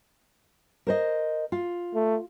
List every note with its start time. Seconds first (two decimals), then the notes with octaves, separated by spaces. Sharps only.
0.87 A#4 C5 D#5
1.52 F4
1.95 A3